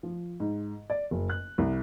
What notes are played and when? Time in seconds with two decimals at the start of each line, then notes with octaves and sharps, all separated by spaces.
0.03 F3
0.40 G#2
0.90 D5
1.11 F#1
1.30 F#6
1.58 C2